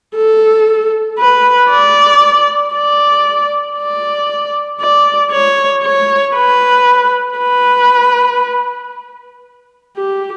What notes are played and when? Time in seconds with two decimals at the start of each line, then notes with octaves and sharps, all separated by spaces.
0.16 A4
1.19 B4
1.70 D5
2.73 D5
3.77 D5
4.80 D5
5.32 C#5
5.83 C#5
6.35 B4
7.38 B4
9.97 G4